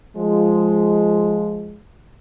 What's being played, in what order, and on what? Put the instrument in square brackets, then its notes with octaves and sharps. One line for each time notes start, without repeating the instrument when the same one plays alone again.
[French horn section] F3 G#3